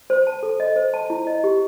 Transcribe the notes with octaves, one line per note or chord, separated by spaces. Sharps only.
C5
A5
A4
D#5
C5
A5
E4
D#5
G4